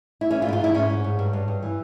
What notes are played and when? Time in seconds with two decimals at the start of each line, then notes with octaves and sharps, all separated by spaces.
0.21 E4
0.31 E3 C#4
0.42 F4
0.46 G#2 E4
0.53 F4
0.60 G#2 E4
0.75 G#2 C#4
0.90 G#2
1.04 G#2
1.19 G2
1.33 G2
1.48 G2
1.62 E3